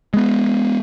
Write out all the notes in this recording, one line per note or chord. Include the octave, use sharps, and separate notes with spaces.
G#3 B3